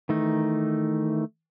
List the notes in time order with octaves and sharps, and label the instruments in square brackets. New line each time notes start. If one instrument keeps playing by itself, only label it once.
[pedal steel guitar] D#3 E3 A3 D#4